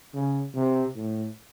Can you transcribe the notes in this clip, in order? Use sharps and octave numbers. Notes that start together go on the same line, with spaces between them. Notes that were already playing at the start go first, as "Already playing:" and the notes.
C#3
C3
A2